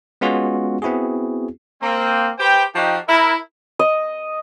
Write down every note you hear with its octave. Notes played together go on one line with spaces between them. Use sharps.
G#3 B3 C#4 F4 F#4
B3 C4 E4 F#4 G#4
A#3 C4
G4 B4 C5 G5
F3 D#4 F#4 G4
E4 A#4
D#5